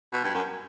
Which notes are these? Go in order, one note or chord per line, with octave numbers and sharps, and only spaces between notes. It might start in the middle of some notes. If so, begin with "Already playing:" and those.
B2
G2
F#2